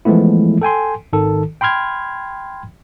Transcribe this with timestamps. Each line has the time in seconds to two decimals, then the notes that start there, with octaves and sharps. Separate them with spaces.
0.05 E3 F3 G#3 A3 B3 E4
0.61 A4 G5 G#5 C6
1.13 G#1 D#3 A4
1.61 G5 B5 C6 F6 G#6